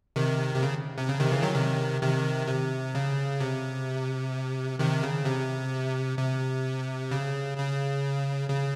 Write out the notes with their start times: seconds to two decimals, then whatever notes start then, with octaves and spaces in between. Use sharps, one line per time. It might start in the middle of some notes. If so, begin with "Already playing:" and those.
0.16 C3 D#3
0.55 C3
0.62 C#3
0.98 C3
1.09 C#3
1.20 C3 D#3
1.32 C#3 E3
1.43 D#3 F#3
1.55 C3 D#3
2.02 C3 D#3
2.47 C3
2.95 C#3
3.41 C3
4.79 C3 D#3
5.03 C#3
5.25 C3
6.18 C3
7.11 C#3
7.58 C#3
8.50 C#3